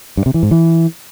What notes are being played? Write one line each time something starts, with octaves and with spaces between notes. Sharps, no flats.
G2
C3
E3
G#2
E3